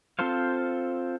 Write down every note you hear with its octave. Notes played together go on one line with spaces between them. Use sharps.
C4 F4 A4 C5 F5